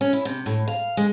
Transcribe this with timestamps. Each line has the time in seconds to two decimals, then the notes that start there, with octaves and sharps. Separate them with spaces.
0.01 C#4
0.13 E4
0.25 C3
0.46 A2
0.68 F5
0.97 G#3